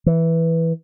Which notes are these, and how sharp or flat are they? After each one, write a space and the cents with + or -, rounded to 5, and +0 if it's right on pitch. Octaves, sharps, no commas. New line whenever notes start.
E3 -5